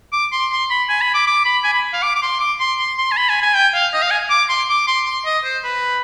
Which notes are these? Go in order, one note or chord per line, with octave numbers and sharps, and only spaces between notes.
D6
C6
C6
B5
G#5
B5
D6
D6
B5
G#5
B5
F5
D6
D6
C6
D6
C6
C6
C6
G#5
B5
G#5
G#5
G5
F5
D#5
F5
G#5
D6
C6
D6
C6
C6
D#5
C5
B4